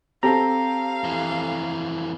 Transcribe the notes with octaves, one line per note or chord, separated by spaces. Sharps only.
C4 G4 A4 F5 A#5
F2 E3